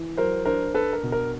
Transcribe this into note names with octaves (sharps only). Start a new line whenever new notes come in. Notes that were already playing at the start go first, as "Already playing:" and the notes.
Already playing: E3
F#3 A#4 C5
D4 A#4 C5
D4 A4 B4
A#4
B2
A#4